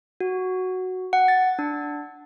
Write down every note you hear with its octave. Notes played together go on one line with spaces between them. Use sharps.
F#4
F#5
A6
D4